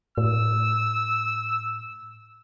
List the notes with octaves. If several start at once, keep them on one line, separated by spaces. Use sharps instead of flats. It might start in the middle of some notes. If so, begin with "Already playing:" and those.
A2 E6